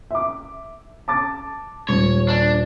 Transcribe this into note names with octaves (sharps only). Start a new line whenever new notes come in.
E5 D6
A5 D6 A6
D#1 C#5
D4